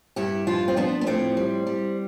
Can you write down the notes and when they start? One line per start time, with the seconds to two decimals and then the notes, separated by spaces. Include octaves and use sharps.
0.16 G2 E4 G4
0.47 F3 D4 F4
0.68 C4
0.77 F3 B3 D4
1.01 B3
1.07 A2 A3 C4
1.37 G3
1.67 G3